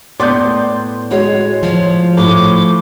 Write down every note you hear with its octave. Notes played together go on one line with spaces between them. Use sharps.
A2 B3 D5 C6 G6
G#3 F#4 C#5
F3 C#5
A2 D6